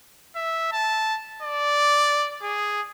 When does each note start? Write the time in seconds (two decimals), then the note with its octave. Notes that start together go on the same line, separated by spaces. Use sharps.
0.36 E5
0.72 A5
1.42 D5
2.43 G#4